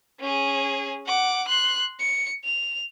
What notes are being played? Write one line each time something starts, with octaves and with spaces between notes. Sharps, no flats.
C#4 G#4
F#5 D6
C6 F#6
C#7
F7